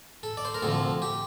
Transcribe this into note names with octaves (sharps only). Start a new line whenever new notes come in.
A4
D5
C5
A#4
D2 C3 F3 A4
G4